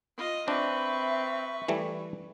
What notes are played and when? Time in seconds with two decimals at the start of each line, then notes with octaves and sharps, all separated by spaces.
0.17 F4 D#5
0.48 C4 D4 B4 E5 C#6
1.68 E3 G3 A3